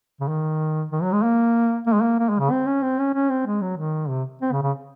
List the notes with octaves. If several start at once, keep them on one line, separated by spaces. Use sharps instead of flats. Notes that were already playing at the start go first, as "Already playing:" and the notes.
C#3
D#3
D#3
F#3
G#3
A#3
A#3
G#3
A#3
A#3
G#3
C#3
C4
C#4
C4
C#4
C#4
C4
G#3
F#3
D#3
C3
C4
C#3
C#3